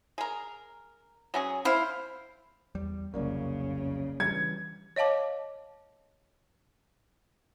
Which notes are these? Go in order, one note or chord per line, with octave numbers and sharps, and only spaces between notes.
G#4 A#4
F#3 C#4 G#4
E4 C5 F5
E2 G3
F1 C2 F#2 C#3 A#3 D5
E3 G3 G#6 C#7
C#5 D#5 F5 A5 D6